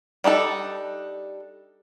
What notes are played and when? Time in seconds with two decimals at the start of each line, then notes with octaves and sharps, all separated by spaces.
0.24 G3 D4 D#4 A4